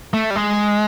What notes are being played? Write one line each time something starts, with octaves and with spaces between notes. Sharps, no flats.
A3
G3
G#3